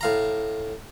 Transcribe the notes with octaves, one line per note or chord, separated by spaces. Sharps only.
A2 F5 A#5